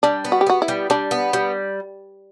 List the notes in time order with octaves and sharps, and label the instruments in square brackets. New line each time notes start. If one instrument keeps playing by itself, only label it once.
[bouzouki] G3 [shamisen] D4
[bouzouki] B3
[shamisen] F#4
G4
[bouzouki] B3 [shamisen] F#4
[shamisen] E4
[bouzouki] G3
[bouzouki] G3 [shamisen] D4
[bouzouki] B3
G3